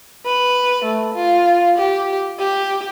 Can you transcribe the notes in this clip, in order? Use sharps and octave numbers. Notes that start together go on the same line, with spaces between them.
B4
A3
F4
G4
G4